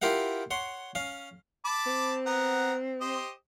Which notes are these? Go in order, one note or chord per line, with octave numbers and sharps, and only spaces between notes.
E4 F4 G4 A#4 F5 F#5
C#5 F#5 C6
C#4 F5
A5 B5 D6
C4
B3 F#5 A#5
G4 C5 D#5